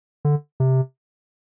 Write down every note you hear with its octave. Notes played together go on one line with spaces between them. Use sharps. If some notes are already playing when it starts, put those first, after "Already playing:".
D3
C3